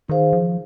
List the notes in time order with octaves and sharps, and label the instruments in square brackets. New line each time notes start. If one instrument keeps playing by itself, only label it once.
[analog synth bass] D#3 [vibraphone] D#4 G#4 C5 F5
[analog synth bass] F3